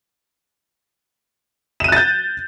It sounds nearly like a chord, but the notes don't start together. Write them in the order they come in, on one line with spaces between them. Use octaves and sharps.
E7 D#7 F#6 A6 G6